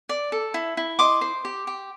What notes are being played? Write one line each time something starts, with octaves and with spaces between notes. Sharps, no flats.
D5
A4
E4
E4
D#5 C6 D6
C5
G4
G4